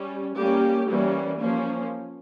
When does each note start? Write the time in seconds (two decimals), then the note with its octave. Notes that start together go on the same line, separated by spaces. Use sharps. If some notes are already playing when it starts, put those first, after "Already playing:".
Already playing: G3 C#4
0.36 G3 A#3 C#4 G4
0.88 E3 G3 A#3 C#4
1.41 F3 A#3 C#4